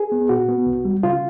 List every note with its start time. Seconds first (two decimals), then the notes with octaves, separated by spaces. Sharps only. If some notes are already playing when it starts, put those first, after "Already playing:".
Already playing: G#4
0.12 B3
0.29 A#2 F#4
0.49 B3
0.66 C2
0.85 G3
1.03 C#3 F4